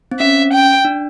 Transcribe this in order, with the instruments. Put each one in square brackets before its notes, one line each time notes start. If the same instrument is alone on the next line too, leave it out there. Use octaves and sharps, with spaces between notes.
[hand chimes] C4
[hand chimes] C#4 [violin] E5
[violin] G5
[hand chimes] D4